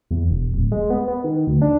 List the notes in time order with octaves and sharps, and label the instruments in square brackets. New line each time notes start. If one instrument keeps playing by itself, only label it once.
[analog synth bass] E2
E1
D1
G#3
B3
B3
D#3
D2
D4